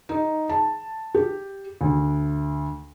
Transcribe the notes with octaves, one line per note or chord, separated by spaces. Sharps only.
D#4
A5
G4
D2